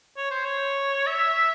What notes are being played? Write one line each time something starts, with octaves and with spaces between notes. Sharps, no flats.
C#5
C5
C#5
E5